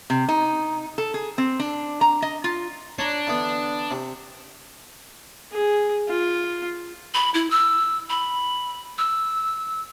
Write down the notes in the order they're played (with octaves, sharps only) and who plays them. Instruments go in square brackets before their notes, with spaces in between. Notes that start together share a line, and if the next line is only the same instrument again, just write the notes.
[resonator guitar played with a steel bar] C3
D#4
A4
G#4
C4
D4
A#5
D#5
F4
[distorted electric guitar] D4 [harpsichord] C#5 A#5
[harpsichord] D3 E3 B3
C3
[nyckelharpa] G#4
F4
[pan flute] B5
E4
E6
B5
E6